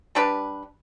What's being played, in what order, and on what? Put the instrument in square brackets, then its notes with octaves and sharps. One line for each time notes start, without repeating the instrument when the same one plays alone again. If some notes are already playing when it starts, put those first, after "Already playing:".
[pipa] G3 D4 G4 B4